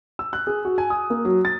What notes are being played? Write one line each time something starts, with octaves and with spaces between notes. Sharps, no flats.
E6
F#6
G#4
F#4
G#5
D#6
A#3
F#3
A6